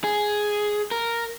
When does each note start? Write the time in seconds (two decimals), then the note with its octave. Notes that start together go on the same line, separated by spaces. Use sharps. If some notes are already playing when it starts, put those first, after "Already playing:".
0.04 G#4
0.91 A#4